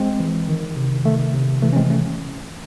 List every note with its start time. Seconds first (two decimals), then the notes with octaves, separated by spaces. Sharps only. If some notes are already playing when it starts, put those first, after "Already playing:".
Already playing: G#3 C4
0.20 E3
0.49 D#3
0.77 C3
1.05 D#3 A3
1.34 C3
1.62 E3 A3
1.73 C#4
1.76 G#3 C4
1.90 A3 C#4